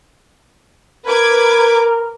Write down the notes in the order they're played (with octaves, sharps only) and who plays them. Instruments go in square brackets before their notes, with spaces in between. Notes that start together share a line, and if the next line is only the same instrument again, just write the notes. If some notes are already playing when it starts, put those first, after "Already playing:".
[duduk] A#4 [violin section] B4 D6 G#6